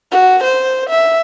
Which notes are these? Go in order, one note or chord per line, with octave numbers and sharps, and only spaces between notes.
F#4
C5
E5